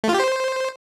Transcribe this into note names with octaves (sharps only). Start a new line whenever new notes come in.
A3
F4
G4
C5